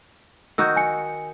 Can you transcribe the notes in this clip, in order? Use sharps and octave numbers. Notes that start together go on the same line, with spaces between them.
D#3 D#4 F#4 E6 G6
G#5 C#7